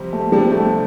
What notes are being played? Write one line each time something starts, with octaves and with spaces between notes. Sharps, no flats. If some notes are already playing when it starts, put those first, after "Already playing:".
Already playing: F2 C3 G3 C4
A3
C3 F3 G3 D4
A3